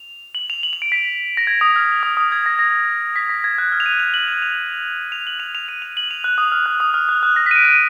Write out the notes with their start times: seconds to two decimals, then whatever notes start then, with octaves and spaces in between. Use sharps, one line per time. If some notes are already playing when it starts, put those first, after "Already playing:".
Already playing: F7
0.35 F#7
0.50 F7
0.63 F#7
0.73 F7
0.82 D7
0.92 B6
1.37 A#6
1.47 G#6
1.61 D#6
1.76 F6
2.03 D#6
2.17 D#6
2.32 G#6
2.46 A#6
2.59 A#6
3.16 B6
3.29 A#6
3.44 G#6
3.58 F#6
3.72 F6
3.80 F7
3.86 D#7
4.00 F7
4.14 F#7
4.28 F7
4.42 F7
5.12 F7
5.27 F#7
5.40 F7
5.55 F7
5.68 D#7
5.82 F7
5.97 F#7
6.11 F7
6.24 F#6
6.38 D#6
6.52 F6
6.66 F#6
6.80 D#6
6.94 F6
7.09 F#6
7.23 F#6
7.36 A#6
7.46 B6
7.51 D#7
7.56 D7
7.65 D#7